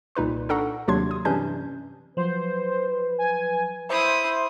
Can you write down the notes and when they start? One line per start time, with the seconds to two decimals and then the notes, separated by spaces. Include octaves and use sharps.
0.15 C2 A#2 D#4 B4 C6
0.49 D4 A4 F#5 A#5 C#6
0.88 D#2 C3 F#3 D4 C6 G#6
1.11 D#6
1.25 G2 C3 E3 C#4 D4 G6
2.17 F3 F#3 B4 C5
3.18 G#5
3.90 E4 C5 E5 D#6